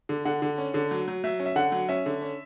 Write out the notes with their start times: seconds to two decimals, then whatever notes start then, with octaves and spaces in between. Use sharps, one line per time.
0.09 D3
0.25 D3 F#5
0.42 D3
0.58 C#4
0.74 D3
0.91 F#3
1.08 F#3
1.24 F#3 E5
1.40 C#4
1.46 E5
1.56 D3 F#5
1.72 F#3
1.89 C#4 E5
2.06 D3
2.22 C#4